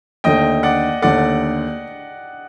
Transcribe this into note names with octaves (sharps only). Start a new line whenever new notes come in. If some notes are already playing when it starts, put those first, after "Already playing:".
D#2 D3 A3 D#5 G5
D5 F#5
D#2 D3 A3 D5 F#5